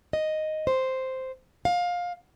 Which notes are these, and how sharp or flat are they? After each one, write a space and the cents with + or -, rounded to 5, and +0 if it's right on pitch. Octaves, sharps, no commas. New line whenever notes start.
D#5 +0
C5 -5
F5 +20